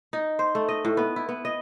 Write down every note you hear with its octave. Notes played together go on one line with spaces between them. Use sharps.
D#4
C5
A3
D#5
A2
B3
E4
B3
D#5